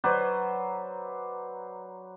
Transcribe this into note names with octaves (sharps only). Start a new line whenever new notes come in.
F#3 B4 C5 D5